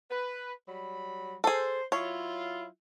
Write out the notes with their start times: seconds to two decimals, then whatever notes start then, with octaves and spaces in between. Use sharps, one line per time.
0.10 B4
0.68 F#3 G3 B5
1.44 G#4 A4 C5
1.92 F#3 E4 F4 C#5